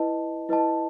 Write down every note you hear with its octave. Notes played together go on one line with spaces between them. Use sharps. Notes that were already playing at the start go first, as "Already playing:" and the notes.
Already playing: E4 B4 D#5 A5
E4 B4 D#5 A5